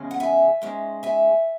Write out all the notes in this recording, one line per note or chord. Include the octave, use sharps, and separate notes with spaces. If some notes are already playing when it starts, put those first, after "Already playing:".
Already playing: E2 C#3 G#3 C#4
F#5
E5 G#5
G#2 G#3 C#4
E5 G#5